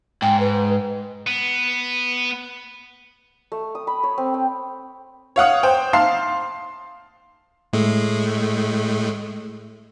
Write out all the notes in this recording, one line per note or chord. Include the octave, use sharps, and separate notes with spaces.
G#2 G5
B4
B3
A3
D#6
B5
C#5
C4
G5
C#5 F5 F#5 D#6
C5 G5
F5 A5 C6 C7
A2 G#3 A3